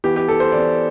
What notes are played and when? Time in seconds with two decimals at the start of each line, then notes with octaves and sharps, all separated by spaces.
0.04 E3 B3 G4
0.16 G4
0.28 A4
0.40 C5
0.52 E3 D5
0.58 B3